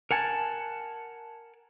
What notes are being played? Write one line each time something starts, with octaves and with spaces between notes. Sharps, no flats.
A#4 F#5 G#5 A5